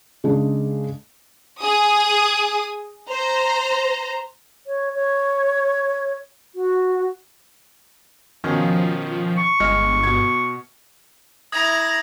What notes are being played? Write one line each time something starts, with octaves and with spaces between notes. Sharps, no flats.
C#3 G#3 D4 D5
G#4 D#6
C5 A#5
C#5
C#5
F#4
B2 D#3 F3 C#4
C#6
G1 G#3 D#5 F6
B2 G#6
E4 A#5 D#6 G#6 A#6